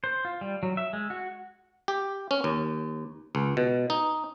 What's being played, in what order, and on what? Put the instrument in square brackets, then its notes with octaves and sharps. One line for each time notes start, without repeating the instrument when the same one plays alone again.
[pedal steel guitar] C5
F4
G3
F#3
E5
G#3
F#4
[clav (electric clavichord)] G4
C#4
D#2
C#2
B2
D#4